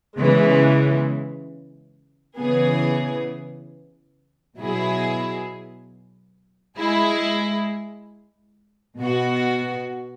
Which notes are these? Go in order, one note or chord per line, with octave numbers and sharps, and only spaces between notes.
C#3 E3 G#3 B3
C#3 E3 B3 G#4
B2 F#3 E4 G#4
G#3 E4 G#4
B2 B3 F#4